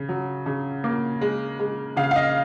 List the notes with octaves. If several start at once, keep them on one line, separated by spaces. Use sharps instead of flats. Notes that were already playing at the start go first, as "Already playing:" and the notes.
Already playing: C#3
F#3
C#3
A#3
G#3
G#3
C#3 F5
F5
D#5